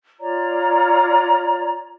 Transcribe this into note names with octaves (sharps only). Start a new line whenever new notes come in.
F4 C#5 D5 A#5